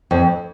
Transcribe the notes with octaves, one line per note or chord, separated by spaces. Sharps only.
F2